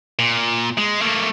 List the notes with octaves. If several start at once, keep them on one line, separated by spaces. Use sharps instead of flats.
A#2
G#3
A3 A#3